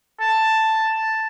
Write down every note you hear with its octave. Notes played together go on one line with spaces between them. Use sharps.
A5